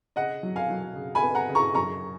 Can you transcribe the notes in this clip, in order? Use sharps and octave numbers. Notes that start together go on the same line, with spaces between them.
C#3 D#5 F#5
F#3
F5 G#5
F#3
C#3
G#5 B5
B3
F#5 A#5
C#3
A#5 C#6
F#2 A#5 C#6